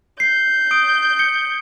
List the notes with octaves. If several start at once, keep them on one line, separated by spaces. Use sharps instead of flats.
G6 C7
D#6 D7
C#7